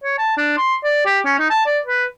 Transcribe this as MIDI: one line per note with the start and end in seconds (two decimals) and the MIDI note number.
0.04 0.18 73
0.18 0.37 81
0.37 0.55 62
0.57 0.75 84
0.84 1.05 74
1.06 1.20 67
1.25 1.37 61
1.39 1.49 63
1.50 1.64 81
1.66 1.79 74
1.86 2.05 71